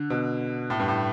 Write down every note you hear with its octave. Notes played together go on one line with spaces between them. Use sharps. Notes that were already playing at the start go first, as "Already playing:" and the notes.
Already playing: D3
B2
A2
G2
A2